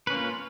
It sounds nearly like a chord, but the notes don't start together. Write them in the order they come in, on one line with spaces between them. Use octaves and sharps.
B4 C#4 A#3 F4